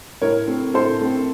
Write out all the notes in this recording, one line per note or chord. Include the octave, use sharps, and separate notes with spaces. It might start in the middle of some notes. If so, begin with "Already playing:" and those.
A2 A#4 C#5
A3 C4
A2 A4 C5
A3 C4